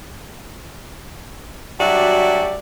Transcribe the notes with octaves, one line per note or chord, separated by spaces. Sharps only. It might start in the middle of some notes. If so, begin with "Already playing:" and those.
F#3 G3 D4 F#4 D5 E5